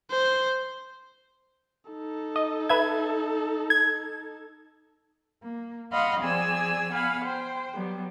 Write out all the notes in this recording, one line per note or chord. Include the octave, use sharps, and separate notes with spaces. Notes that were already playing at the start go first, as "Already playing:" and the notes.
C5
D#4 A4
D#5
B4 E5 G#6
G#6
A#3
D#5 F5 F#5 B5 C6
F3 C4 G#4 D5 G#5 E6
B3 F5 F#5 G#5 B5
C5 G5
F#3 G3 B3